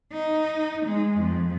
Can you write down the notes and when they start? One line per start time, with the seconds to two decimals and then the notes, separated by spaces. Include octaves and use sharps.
0.12 D#4
0.86 G#3
1.18 F2